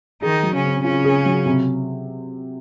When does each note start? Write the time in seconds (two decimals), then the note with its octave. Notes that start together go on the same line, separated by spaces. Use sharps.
0.22 D#3 D#4 G#4
0.43 F#3
0.53 C#3 C#4
0.63 C4
0.83 C#3 C#4 F4
1.04 G#4
1.25 F#3
1.46 C3